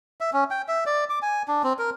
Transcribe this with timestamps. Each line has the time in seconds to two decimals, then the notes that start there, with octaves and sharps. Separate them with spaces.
0.21 E5
0.33 C#4
0.51 G5
0.68 E5
0.86 D5
1.09 D6
1.22 G#5
1.48 D4
1.63 C4
1.79 A#4